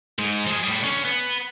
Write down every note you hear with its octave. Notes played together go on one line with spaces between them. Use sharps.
G#2 G#3
F3 G#4
A2 G3
D3 C#4
B4 F#5